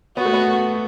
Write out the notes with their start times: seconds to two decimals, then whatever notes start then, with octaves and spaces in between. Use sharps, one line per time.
0.17 B3 F#4
0.25 A3
0.33 B3